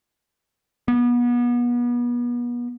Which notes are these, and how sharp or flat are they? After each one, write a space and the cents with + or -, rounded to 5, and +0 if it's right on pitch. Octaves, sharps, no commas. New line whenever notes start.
B3 -35